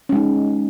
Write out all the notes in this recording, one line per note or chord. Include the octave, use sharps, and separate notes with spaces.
G#3 C#4 D#4